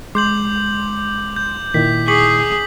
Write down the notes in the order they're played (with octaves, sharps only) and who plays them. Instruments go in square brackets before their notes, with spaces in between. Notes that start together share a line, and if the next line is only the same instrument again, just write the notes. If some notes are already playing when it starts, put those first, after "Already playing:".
[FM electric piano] G#3 C6 [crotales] D6 G6 F#7
[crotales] G6
[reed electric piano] A#2 D#3 E4 [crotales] B6
[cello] G#4 [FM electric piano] C#6 [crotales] D6 B6 F#7